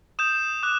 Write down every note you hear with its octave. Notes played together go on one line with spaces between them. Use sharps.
D#6 G6 E7
D6 F#6